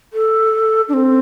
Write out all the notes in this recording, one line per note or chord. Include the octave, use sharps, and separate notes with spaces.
A4
D4
C4